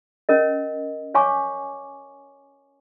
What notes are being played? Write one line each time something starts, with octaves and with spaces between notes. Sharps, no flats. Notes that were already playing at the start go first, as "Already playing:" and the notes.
C#4 A#4 D#5
C#5 F5 G#5 C#6 D6